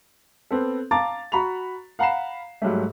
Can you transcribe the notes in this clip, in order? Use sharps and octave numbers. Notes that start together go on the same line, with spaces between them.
B3 C4 A4
F5 A5 A#5 D6 A6
F#4 A#5 B5 C#6 F7
F5 F#5 A#5 B5 C7 E7
G#2 F#3 G3 A3